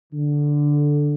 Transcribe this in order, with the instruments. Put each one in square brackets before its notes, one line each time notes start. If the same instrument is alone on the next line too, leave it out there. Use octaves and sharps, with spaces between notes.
[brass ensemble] D3